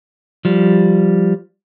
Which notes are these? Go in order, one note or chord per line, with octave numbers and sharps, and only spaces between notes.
F3 G3